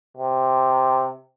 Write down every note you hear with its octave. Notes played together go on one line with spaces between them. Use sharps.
C3